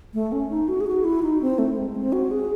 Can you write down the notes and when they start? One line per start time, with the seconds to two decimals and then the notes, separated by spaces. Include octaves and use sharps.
0.14 A3
0.32 C#4
0.50 D#4
0.68 F#4
0.81 G#4
0.87 F#4
1.04 E4
1.23 D#4
1.42 C4
1.58 A3
1.77 G#3
1.96 C4
2.13 F#4
2.31 G#4